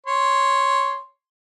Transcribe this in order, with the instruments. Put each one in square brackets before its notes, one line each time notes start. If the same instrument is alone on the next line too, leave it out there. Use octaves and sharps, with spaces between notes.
[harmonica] C#5 C6